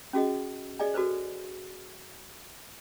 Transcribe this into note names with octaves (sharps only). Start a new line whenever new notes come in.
C#4 F#4 G#4 D#5
G#4 D5 D#5 G#5
F#4 A4 B4 C5